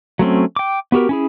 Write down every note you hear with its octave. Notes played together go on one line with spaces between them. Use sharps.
F#3 A3 C4 C#4
G5 D6
B3 F#4 G4 A#4
C#4 E4 G#4